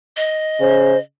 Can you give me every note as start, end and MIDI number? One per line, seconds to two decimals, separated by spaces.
0.17 1.00 75
0.60 0.95 49
0.60 0.97 72